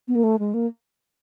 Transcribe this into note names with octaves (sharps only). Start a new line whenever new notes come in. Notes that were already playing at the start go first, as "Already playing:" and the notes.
B3
A#3
A3
G#3
A#3